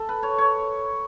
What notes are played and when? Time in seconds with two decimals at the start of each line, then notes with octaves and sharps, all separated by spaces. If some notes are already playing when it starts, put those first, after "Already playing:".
Already playing: A4
0.09 B4
0.23 C#5
0.38 C#5